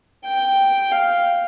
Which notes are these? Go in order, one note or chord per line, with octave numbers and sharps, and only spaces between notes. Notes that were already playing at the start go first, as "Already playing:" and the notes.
G5
F5